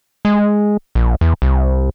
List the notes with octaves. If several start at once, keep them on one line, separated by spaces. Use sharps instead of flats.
G#3
A#1
E2
C2